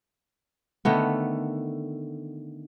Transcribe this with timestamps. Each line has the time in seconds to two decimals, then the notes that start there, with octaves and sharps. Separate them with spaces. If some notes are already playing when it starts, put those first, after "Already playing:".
0.85 D3 D#3 A3 B3